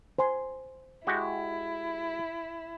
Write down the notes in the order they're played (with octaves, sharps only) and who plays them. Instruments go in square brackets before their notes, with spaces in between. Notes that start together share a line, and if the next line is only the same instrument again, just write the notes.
[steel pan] C5 G#5 C6
[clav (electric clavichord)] G#3 F#4 G4 [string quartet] E4